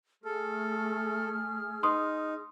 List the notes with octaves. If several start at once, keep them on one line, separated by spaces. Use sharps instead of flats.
A3 G#4 A4 F6
D#4 C6 D#6